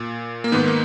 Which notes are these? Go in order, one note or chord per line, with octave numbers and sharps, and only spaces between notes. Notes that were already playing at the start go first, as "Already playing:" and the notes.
Already playing: A#2
A#3
G#2 D#3 B3
A#3